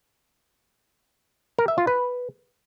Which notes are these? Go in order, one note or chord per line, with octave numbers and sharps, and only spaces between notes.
A#4
E5
F4
B4